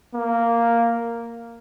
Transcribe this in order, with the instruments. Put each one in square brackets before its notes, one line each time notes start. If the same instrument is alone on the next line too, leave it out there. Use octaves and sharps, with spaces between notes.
[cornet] A#3